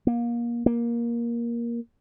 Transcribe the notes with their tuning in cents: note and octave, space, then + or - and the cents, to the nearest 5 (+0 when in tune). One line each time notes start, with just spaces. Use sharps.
A#3 +25
A#3 +15